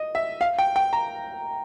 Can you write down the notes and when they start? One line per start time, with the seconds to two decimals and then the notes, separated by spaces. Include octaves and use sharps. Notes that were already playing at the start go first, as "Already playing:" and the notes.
Already playing: D#5
0.15 E5
0.41 F5
0.59 G5
0.76 G5
0.93 A#5